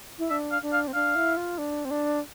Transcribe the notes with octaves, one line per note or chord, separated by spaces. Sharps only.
E4
D4 E5
F5
D4
F5
C4
D4 F5
E4
F4
D4
C4
D4